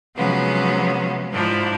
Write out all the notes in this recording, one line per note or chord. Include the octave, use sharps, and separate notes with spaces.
C3 F3 F#3 G#3 B3 C#4
G#2 F3 D4 E4